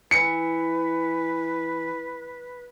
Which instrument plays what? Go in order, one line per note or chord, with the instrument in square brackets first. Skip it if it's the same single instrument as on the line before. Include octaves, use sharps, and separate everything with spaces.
[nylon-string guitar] E3 [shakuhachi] B4 [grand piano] C#7